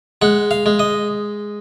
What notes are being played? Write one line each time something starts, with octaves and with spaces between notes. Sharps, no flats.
G#3 F#5
F5
G#3
D#5